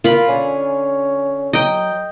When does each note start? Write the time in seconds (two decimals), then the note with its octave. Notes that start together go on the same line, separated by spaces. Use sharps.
0.04 F4 A#4 B5
0.28 D3 C#4 G#5
1.53 F#3 D#5 G5